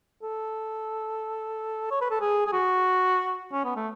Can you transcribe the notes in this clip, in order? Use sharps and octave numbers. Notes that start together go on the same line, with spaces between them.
A4
C#5
B4
A4
G#4
G#4
F#4
C#4
B3
A3